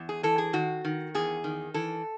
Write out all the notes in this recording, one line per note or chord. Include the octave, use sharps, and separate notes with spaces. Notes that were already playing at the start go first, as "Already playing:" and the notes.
Already playing: E2
G#4
E3 A4
G#4
D#3 F#4
D#3
E2 G#4
D#3
E3 A4